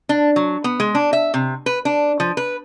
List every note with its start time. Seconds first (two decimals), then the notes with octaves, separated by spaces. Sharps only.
0.09 D4
0.36 F#3
0.64 B3
0.80 G#3
0.95 D4
1.13 E5
1.34 C3
1.66 B4
1.85 D4
2.20 F3
2.37 B4